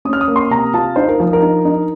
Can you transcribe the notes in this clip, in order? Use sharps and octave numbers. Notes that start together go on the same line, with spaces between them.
C#4 D#6
F6
D#6
A#3
C6
C3 A#5
F4 A5
D#4 C5
A#4
F3
A#4
D#4
D#4